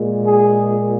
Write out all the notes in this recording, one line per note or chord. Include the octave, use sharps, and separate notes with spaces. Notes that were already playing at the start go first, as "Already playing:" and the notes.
Already playing: A#2 G#3
G#4